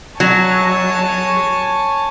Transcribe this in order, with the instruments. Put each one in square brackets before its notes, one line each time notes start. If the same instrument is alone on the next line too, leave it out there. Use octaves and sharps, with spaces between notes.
[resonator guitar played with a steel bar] F#3 [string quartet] C#5 G#5 A5